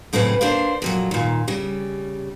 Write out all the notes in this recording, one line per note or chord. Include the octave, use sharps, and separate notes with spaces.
F#2 A2 C#3 C4 B4
A#3 D4 C5
F2 A#2 F#3
D#2 A#2
C#3 G3